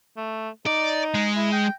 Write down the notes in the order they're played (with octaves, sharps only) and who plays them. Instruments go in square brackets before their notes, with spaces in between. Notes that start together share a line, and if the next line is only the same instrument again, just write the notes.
[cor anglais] A3
[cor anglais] D#4 [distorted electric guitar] D5
[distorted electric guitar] G#3
[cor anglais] E4
G5